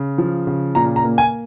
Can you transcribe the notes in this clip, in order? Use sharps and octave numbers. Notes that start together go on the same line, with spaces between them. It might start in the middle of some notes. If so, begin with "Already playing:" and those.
Already playing: C#3
F3
C#3
A#2 A#5
A#5
A#3
G#5